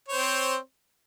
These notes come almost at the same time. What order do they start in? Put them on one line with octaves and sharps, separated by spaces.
C#5 C5 C4